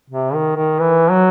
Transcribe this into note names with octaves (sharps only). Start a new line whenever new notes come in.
C3
D#3
D#3
E3
F#3